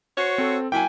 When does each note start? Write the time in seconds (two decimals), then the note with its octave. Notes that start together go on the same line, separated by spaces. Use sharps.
0.17 F#4 C5 C#5
0.38 C4 A4
0.72 F#3 A#3 E4 G5 G#5